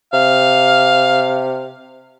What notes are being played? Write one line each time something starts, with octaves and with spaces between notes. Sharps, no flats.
C3 F5